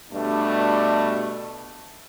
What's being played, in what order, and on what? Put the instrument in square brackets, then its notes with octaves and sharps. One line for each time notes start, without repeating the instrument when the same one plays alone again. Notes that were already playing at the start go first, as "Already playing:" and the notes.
[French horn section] G2 B2 G3 A3 D4